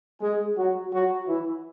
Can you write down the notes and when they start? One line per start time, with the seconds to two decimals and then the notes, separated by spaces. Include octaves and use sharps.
0.21 G#3 G#4
0.57 F#3 F#4
0.93 F#3 F#4
1.27 E3 E4